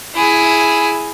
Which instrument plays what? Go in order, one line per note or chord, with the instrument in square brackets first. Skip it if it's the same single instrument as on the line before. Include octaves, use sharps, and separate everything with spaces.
[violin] E4 G#4